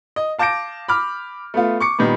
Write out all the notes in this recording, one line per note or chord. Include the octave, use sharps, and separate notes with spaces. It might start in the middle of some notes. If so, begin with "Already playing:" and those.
D#5
F5 A5 D6 G6 A#6 D7
B5 D6 F6
A3 B3 F4
C#6 D6 C#7
A#2 D#3 G3 B3